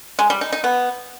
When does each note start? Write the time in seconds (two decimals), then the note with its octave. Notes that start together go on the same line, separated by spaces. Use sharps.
0.19 G#3
0.30 G3
0.41 D#4
0.52 D#4
0.64 B3